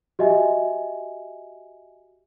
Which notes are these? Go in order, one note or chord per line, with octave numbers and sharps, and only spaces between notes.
F#4 G4 D#5 E5 G#5